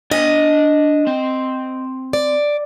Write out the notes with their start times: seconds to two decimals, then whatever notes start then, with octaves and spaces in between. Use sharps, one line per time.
0.11 D4 D#5 G#5
1.07 C4
2.13 D5